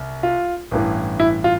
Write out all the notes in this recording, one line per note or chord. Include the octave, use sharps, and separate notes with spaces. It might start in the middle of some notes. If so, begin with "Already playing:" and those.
Already playing: C2
F4
A1 G2 E3
E4
F4